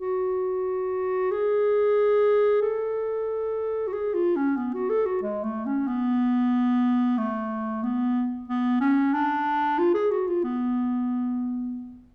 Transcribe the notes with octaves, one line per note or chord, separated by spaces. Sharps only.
F#4
G#4
A4
F#4
G#4
F4
C#4
B3
F#4
A4
F#4
G#3
A3
C#4
B3
A3
B3
B3
C#4
D4
F4
G#4
F#4
F4
B3